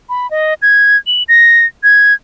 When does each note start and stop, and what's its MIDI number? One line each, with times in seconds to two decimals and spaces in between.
0.09 0.29 83
0.31 0.54 75
0.62 0.97 92
1.07 1.23 102
1.29 1.66 94
1.83 2.14 92